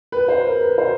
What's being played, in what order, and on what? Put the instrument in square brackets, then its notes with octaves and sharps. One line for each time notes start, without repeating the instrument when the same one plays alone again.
[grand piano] B4
C5
A#4
B4
C5